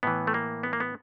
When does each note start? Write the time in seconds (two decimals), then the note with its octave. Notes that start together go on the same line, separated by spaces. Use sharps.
0.03 A2 E3 B3
0.27 A3
0.34 A#3
0.63 B3
0.73 A#3
0.80 B3